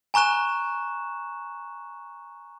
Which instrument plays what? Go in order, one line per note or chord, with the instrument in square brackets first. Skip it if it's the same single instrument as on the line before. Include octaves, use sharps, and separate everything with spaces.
[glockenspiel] G#5 A#5 C#6 F#6 E7